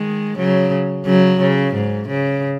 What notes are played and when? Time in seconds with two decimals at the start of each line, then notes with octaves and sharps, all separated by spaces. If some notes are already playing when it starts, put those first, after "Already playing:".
Already playing: D#3 G#3
0.38 C#3 F#3
1.06 C#3 F#3
1.40 C#3
1.75 G#2
2.08 C#3